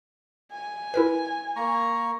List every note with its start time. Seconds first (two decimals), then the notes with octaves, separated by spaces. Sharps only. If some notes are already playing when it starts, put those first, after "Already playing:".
0.52 G#5
0.94 E4 A#4 B4
1.56 A#3 A#5 C#6